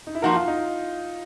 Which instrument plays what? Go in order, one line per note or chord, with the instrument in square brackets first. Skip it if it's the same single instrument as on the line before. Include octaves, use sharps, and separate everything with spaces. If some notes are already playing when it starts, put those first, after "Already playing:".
[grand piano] D#4
E4
[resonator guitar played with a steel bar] F3 A#3 D#4 F#4 A#4 [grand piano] F4
[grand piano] F4
D#4